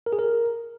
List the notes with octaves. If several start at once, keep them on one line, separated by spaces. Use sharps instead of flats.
A#4
G#4
A#4